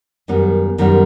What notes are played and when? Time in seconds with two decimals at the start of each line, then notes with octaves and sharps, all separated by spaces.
0.28 F#2 D#3 G3 B3
0.78 F#2 D#3 G3 B3